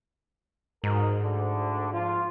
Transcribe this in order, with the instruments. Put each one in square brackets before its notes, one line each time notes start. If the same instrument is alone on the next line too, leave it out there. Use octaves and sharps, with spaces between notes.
[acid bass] G#2 [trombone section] D#4 F#4 A#4
[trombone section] D2 D3
F3 F4